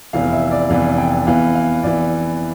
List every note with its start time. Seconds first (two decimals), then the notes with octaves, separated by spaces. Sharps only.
0.13 F1 E2 E3 F5
0.33 E5
0.51 D5
0.70 F1 E2 E3 F5
0.98 G5
1.27 E2 E3 F5
1.55 F5
1.83 E2 E3 D5